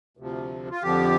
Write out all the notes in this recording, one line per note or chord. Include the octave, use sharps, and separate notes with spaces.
D2 C3 F3
F4
F2 D3 F3 G4